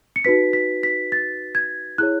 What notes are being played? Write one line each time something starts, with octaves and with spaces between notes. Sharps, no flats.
C#7
D#4 F#4 B4 B6
B6
B6
A6
G#6
E4 G#4 C#5 F#6